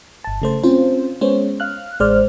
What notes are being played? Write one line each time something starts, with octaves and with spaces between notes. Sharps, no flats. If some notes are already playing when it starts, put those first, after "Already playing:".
G1 A5
C#3 A3 C5
C4 C#4 F4 C5
G#3 B3 C#4 C5 C#5
F5 F6 F#6
A1 G#3 C5 D5 F6